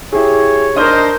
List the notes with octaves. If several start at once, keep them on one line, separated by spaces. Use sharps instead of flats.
E4 G4 G#4 C#5
D4 D#4 A#4 C5 D5 D#5 F6 G7